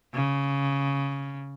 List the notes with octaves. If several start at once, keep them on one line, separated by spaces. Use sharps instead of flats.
C#3